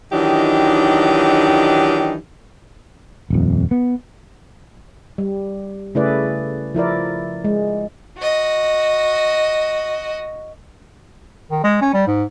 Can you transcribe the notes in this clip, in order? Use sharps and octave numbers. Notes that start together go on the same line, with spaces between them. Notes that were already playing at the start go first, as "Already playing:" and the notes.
D#3 E3 F#3 D4 D#4 G4
D#1 F2
B3
G3
C#3 A3 E4 G#4 B4 D5
F3 E4 A#4 D5
G#3
F#4 D#5
D#3
G#3
C#4
G3
G#2